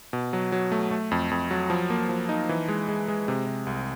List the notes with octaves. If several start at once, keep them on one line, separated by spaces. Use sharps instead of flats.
B2
F#3
F#3
A3
A3
F2
F2
F#3
F3
A#3
F3
D#4
E3
G#3
G#3
G#3
C3
C3
C2